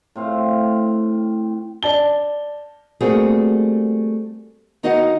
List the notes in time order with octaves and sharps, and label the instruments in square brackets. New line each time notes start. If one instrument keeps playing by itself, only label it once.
[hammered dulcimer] A2 C4 F5
[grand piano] D5 A5 G7
[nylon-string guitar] G3 A3 A#3 C4 F#4 G#4
D#3 D#4 F#4 D#5 F5 F#5